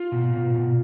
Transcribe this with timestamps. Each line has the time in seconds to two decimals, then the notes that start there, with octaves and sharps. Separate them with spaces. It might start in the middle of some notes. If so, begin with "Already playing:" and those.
Already playing: F4
0.12 B2
0.33 B2
0.55 B2